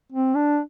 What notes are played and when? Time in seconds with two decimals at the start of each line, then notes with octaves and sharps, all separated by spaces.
0.12 C4
0.35 D4